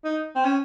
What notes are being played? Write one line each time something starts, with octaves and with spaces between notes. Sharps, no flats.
D#4
C4
C#4